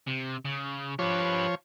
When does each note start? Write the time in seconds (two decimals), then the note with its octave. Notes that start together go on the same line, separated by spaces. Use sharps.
0.07 C3
0.45 C#3
0.99 F3 G4 B4 C#5